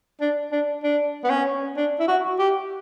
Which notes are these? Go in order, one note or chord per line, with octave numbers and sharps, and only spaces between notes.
D4
D4
D4
B3
C#4
D4
E4
F#4
G4